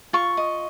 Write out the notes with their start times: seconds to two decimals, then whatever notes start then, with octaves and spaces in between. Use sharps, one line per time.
0.13 F4 C#6
0.37 D#5